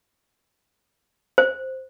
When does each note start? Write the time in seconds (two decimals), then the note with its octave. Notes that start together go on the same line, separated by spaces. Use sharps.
1.38 C5